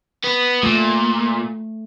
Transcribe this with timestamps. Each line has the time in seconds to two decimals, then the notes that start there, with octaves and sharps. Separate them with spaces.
0.24 B3
0.63 A#2 A3